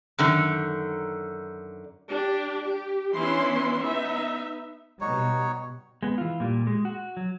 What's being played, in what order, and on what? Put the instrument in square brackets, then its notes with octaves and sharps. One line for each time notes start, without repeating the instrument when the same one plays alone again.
[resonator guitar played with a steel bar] F#2 D3 D#3
[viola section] D4 G4
G4
E3 B3 C#4 D4 E4 C6
B3 D#4 E5
[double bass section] B2 G3 [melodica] D#4 F#4 C#5
[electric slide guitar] G#3 B3
E3 F4
A#2 G3
G#3
F#4
F#3